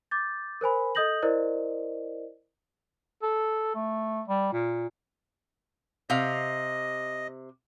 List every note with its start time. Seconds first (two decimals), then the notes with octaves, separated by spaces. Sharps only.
0.11 D6 G6 A6
0.61 A#4 C5 G#5 B5
0.95 A4 D#5 D#6 G6 A#6 F#7
1.22 E4 A#4 C5 D5 D#5
3.22 A4
3.75 A3
4.28 G3
4.53 A#2
6.10 C3 D#5 F5